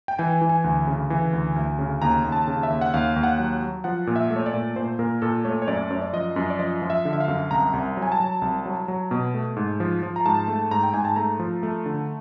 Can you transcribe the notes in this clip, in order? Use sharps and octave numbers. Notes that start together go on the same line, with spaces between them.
G5
E3 G#5
E3
G#5
D2
C#3
E3
D2
D2
C#3
D#2 A#5
D#2
A5
C#3
E5
D#2
F#5
D#2 F5
D#2
F#5
F#3
F#3
F3 F#5
A#2
E5
A3
C#5
D5
A#2
A#2 C5
A#2 A#4
A#2 A4
A3 C#5
C#5
F#2 D5
F#2 C#5
D5
F3 D#5
F#2
D5
F3 D#5
F3
E5
D3
E5
F5
F#2
C2 A#5
C2
F#3
G#5
A5
F#3
C2
F#3
F#3
B2
A3
G#2
F3
F3
A#5
G#2 A5
A3
G#2 A#5
G5
G#2 G#5
A5
A3 A#5
F3
A3
D3